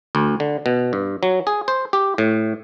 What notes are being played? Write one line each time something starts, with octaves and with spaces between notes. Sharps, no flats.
D2
D3
B2
G2
F#3
G#4
C5
G4
A2